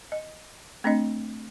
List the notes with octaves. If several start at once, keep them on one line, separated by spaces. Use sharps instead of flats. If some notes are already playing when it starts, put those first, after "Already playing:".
D#5
A3 C4 D4 D#5